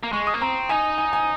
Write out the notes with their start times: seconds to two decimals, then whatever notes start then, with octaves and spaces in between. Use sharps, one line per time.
0.03 A#3
0.12 G#3 C#6
0.27 D#6
0.34 A#3
0.41 C4 A#5
0.69 D#4 G#5
0.98 G#5
1.13 G#5